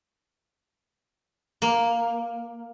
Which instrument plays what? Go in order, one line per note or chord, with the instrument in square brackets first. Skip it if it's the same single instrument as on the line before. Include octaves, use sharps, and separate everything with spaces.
[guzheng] A#3